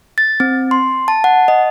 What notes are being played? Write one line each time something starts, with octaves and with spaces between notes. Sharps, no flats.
A6
C4
C6
A5
F#5
D#5